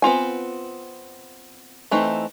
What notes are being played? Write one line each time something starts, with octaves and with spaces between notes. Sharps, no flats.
B3 C4 F4 G#5
E3 A3 C4 D#4